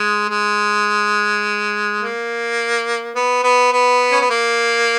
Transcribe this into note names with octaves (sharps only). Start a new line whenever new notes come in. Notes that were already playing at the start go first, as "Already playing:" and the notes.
Already playing: G#3
G#3
A#3
B3
B3
B3
C#4
B3
A#3